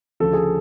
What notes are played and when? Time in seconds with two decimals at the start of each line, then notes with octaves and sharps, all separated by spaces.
0.20 D2 C#3 F3 A4
0.33 G#4